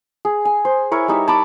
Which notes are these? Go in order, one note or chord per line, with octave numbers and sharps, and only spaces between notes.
G#4
G#5
C5
E4 A#4 C#5
G3 D#4 E5
A5 B5 D6